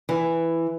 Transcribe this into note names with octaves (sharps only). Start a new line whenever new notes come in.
E3